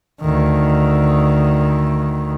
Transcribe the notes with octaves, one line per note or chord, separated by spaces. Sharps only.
D2 D#3